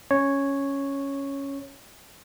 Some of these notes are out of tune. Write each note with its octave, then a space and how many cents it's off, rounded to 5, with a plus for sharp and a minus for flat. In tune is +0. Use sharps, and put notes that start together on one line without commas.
C#4 +0 C#5 -5